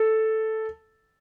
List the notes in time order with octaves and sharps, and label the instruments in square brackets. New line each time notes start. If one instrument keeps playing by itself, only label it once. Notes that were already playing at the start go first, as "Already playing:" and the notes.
Already playing: [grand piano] A4